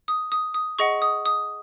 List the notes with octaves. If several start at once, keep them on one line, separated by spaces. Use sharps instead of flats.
D#6
D#6
D#6
G#4 D#5 F#5 C#6
D#6
D#6